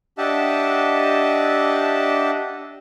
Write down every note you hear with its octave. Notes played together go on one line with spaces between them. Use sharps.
D4 G4 D#5 E5 F#5 A5